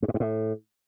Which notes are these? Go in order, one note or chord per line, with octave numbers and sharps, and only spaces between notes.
G2
G#2
G2
A2